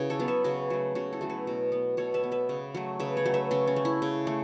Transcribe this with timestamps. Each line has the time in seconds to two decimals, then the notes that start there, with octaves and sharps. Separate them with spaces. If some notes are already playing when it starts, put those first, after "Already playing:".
Already playing: C#3 C#4 E4 F#4 B4
0.10 A4 C#5
0.19 F#3 B3
0.28 B4 E5
0.44 C#3 F#4 B4
0.70 F#3 A3
0.95 C#3 C#4 F#4
1.13 E4 A4
1.21 F#3 A3
1.30 F#4 B4
1.47 B2
1.72 B3
1.97 B2 A4 C#5
2.14 B4 E5
2.24 B3
2.32 B4 E5
2.49 C#3
2.74 F#3 A3
3.00 C#3 B4 E5
3.17 C#5 F#5
3.25 F#3 A3
3.34 B4 E5
3.51 C#3 C#4 F#4
3.67 C#4
3.76 A3
3.85 E4
4.02 C#3
4.27 A3